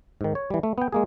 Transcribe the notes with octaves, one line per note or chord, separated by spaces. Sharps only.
G#2 D#3
C#5
E3 G3
A3
B3 G5
G#3 A#3 G#4